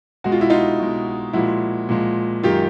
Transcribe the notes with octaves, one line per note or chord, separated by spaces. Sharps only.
B2 G#3 F#4
F4
E4
D#4 F4
B2 G#3
A#2 F3 G#3 E4 F#4
A#2 F3 G#3
F#2 D#3 G#3 F4 G4